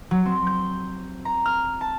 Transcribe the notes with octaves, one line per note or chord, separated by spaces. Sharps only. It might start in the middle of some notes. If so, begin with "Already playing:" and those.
F#3
C4
G6
A#5
F6
A5